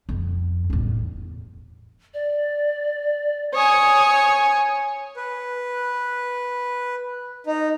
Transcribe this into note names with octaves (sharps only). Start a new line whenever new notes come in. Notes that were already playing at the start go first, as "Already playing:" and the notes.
F2
A1 E2
D5
C#5 G#5 D#6
B4
D#4